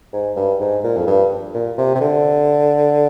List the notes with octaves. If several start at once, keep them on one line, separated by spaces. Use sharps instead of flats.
G#2
G2
G#2
A#2
F2
G2
A#2
C3
C3
D3